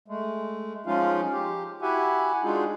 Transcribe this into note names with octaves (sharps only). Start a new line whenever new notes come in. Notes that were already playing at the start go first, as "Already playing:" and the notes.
G#3 A3
F3 G#3 C#4 D#4 F4 F5
G4
E4 F#4 G4 E5 F#5 G#5
G#3 D4 D#4 F4 F#4 G#4